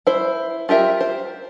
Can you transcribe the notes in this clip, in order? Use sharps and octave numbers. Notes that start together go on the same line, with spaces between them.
E4 C5
F4 G4 A#4 E5
C5